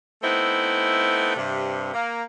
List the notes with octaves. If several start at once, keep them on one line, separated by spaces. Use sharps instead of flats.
A3 B3 C4 D#4 E4
G2 C3
A#3